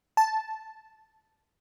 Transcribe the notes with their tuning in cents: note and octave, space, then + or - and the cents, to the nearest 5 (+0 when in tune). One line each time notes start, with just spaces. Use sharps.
A5 -5